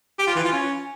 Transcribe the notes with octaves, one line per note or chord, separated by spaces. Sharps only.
G4
F4
E3
F4
C#4